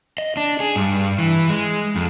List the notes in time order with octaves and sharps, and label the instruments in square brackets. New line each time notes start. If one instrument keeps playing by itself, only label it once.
[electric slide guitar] D#5
D4
G#4
G2
E3
G#3
F2